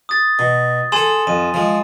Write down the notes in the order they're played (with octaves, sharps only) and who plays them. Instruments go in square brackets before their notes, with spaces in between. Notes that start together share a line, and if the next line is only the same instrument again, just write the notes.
[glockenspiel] D#6 A6
[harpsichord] B2
[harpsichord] G#4 A4 [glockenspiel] G#5 C6 E7
[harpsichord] F2 [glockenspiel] D#7
[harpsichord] F3 G#3